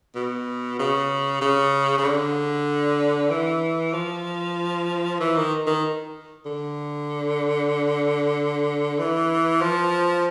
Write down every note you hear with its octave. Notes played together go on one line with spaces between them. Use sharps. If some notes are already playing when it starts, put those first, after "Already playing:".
B2
C#3
C#3
C#3
D3
E3
F3
E3
D#3
D#3
D3
E3
F3